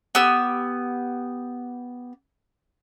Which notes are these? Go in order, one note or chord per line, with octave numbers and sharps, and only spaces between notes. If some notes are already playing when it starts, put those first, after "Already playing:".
B3 G4 E6